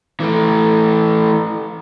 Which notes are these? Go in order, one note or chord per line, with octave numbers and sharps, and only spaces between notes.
E3 A3